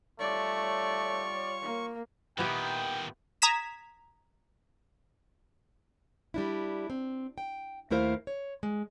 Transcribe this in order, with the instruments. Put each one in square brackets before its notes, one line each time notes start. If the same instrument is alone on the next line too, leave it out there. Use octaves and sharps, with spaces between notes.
[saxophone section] G3 F4 C#5 [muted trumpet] A3 [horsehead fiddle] D5 [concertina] C#6
[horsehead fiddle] A#3
[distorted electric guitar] A#2 D#3 [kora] B3 E4 G4 [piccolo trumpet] G5
[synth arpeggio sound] A#5 D#6 G#6 B6 E7
[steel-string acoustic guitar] G3 D4 E4
C4
G5
D#2 A3 E4 A#4 C5 F5
C#5
G#3